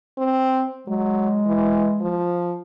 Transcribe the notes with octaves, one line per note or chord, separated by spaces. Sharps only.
C4
F#3 G#3
E3
F3